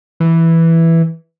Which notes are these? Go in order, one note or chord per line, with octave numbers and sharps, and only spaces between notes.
E3